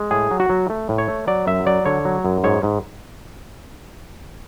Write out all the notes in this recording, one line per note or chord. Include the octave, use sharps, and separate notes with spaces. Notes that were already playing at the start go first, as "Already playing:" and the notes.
Already playing: G#3
A2 G#4
F#3
F#4
F#3
A3
A2
C#5
A3
F#3 D5
F#2 E5
F#3 D5
D3 C#5
F#3
F#2
G#2 C#5
G#2